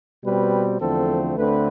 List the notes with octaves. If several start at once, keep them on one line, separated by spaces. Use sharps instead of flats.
B2 G3 C4 B4
E2 D3 F3 A3 C4 A4
D2 D3 A3 C4 B4